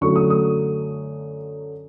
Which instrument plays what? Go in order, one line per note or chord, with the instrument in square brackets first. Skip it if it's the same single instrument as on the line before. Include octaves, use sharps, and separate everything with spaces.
[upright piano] F#2 D3 F#3 A3 C#6
D#6
D#6